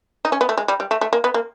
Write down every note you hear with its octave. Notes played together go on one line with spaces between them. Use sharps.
D#4
C#4
B3
A3
G#3
G3
G3
A3
A3
A#3
B3
A#3